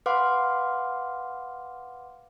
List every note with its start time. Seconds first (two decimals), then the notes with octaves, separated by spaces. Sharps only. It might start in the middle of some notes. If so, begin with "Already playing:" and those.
0.06 B4 F5 F#5 C6 D6